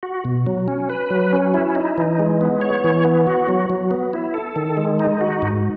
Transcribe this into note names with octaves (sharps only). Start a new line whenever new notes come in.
F#4
B2
F#3
C#4
B4
F#3
C#4
E4
D#4
E3
G#3
B3
C#5
E3
B3
F#4
F#3
F#3
B3
E4
A4
D#3
G#3
D#4
F#4
G#2